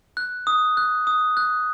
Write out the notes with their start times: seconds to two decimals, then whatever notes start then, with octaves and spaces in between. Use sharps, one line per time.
0.17 F#6
0.47 D#6
0.77 F#6
1.07 D#6
1.37 F#6